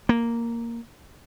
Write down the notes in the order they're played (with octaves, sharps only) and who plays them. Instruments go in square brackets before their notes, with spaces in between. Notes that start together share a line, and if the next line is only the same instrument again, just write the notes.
[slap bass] A#3